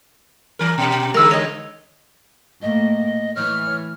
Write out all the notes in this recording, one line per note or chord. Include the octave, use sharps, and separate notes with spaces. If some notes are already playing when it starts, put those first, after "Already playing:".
E3 A#4
B2 G4
D3 G#3 A#4 E6
C#5 D#5
A2 A3 A#3 D#5
A2 E3 C#5 F6